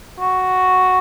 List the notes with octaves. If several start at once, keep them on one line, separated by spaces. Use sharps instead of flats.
F#4